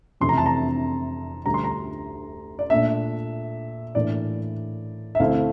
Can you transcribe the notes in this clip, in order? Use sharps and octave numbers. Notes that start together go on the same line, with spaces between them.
F2 C3 E3 A3 E4 C6
A#5
A5
A#5
D2 D3 G3 A#5
C6
A#5
D5
A#2 A3 D4 E5
A2 E3 A#3 D4 D5
E5
D2 D3 A3 C4 E4 F5